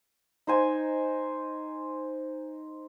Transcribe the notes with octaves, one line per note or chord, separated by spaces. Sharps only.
D#4 C5 G#5